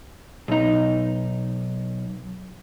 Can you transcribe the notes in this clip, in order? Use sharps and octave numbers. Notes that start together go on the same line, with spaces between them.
B1 D#4